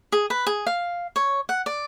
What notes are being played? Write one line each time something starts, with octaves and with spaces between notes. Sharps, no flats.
G#4
B4
G#4
F5
C#5
F#5
D5